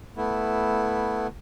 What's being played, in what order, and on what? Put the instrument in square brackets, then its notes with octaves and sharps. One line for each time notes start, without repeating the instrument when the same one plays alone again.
[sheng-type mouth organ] A3 B3 E4